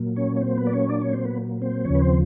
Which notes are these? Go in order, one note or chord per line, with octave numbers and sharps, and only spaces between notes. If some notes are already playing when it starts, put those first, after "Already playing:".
Already playing: A#2 F#3 A#3
C#4 C#5
C#5
C4 C5
B3 B4
D5
C#4 C#5
D4 D5
C#4 C#5
C4 C5
B3 B4
C4 C5
D#2 C#3 F3 C#4 C#5
B4
C4 C5